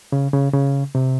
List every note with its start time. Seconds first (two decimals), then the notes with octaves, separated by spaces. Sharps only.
0.12 C#3
0.33 C#3
0.54 C#3
0.95 C3